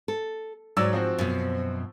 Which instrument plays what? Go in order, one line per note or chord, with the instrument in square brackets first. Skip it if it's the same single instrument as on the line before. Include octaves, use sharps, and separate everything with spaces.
[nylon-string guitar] A4
[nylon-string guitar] G#2 [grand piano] F#3 D5 E6
[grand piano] F3 C4 F#4
[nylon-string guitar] F#2 B2